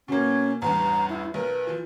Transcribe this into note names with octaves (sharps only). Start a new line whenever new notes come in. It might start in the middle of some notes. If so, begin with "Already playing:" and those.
B2 A#3 C#4
A1 E2 G2 A#5
E4
B1 A#4 B4
E3 F3